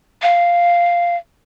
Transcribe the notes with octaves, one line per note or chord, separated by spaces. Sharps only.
F5